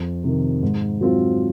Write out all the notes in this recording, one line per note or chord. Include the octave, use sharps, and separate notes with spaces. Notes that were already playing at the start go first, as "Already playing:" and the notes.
Already playing: F2
C3 D#3
G#2
F#3 C4 F4